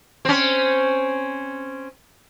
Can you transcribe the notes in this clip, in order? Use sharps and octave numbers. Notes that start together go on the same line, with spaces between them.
C4 C#4